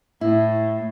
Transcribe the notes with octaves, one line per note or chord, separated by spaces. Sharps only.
A2 E4